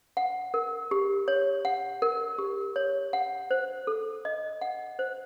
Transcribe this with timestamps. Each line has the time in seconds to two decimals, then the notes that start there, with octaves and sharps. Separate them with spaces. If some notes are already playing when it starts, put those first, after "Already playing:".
0.17 F#5
0.54 A#4
0.91 G4
1.28 C#5
1.65 F#5
2.02 A#4
2.38 G4
2.76 C#5
3.13 F#5
3.51 C5
3.87 A4
4.25 D#5
4.61 F#5
4.99 C5